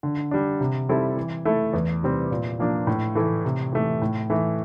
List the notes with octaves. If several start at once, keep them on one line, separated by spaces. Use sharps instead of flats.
D3
G3 D4
C3
G3 C4 E4 A4
E3
A3 E4 A4
E2
C3 G3 C4
A#2
F3 A#3 D4
A2
E3 A3 E4 A4
C3
E3 A3
A2
E3 A3